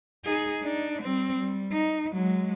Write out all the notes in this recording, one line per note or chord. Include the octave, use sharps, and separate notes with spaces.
D#4 G#4
D4 D#4
G3 C4
G3
D#4
F#3 G#3